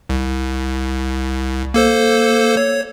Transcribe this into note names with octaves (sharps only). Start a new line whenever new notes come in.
C2
A#3 A4 C5
C#5